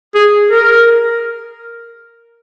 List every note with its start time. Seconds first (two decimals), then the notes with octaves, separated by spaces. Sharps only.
0.15 G#4
0.51 A#4